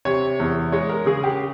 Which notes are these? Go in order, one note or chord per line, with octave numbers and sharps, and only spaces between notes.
C3 C#5
E2
G#3 C#5
A#4
C#3 G#4
G4